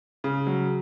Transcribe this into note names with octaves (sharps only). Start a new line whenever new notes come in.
C#3
F#3